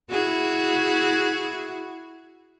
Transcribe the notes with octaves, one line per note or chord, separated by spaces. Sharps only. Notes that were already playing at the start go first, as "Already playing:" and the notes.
E4 F#4 G#4